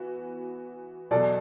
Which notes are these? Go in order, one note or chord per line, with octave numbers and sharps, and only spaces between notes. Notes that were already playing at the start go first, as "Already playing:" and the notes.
Already playing: E3 B3 F#4
E2 B2 F#3 A4 D5